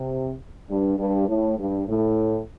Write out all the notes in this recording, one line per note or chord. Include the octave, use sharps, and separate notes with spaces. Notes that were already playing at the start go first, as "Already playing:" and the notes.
Already playing: C3
G2
G2
A2
G2
A2